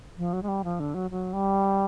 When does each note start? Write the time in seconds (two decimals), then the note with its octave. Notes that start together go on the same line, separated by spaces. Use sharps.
0.18 F3
0.33 F#3
0.43 G#3
0.48 G3
0.64 F3
0.80 D3
0.94 F#3
1.11 F#3
1.33 G3